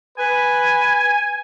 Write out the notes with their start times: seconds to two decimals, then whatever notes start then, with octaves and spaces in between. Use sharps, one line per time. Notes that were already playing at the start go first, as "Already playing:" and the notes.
0.18 B4 G#5